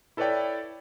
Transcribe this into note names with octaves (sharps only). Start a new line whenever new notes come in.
E4 A4 B4 C#5 D5 G5